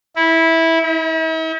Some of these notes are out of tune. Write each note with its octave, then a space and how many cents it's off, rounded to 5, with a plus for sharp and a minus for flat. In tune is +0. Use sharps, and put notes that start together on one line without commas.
E4 -15
E4 -45